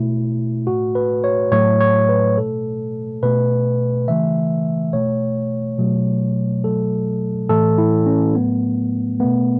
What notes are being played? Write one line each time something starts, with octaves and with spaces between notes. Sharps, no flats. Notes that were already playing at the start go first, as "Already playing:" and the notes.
Already playing: B2 A3 E4
A2 A3 F#4
B4
C#5
A2 F#3 A3 C#5
C#5
B4
B2 A3 A4
B2 A3 B4
C#3 E3 A3 E5
B2 A3 C#5
B2 F#3 A3
B2 F#3 A3 A4
A2 E3 A3 A4
E4
C#4
A2 F#3 A3 B3
B2 A3 B3